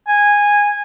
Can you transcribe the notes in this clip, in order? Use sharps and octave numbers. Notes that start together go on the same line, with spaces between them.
G#5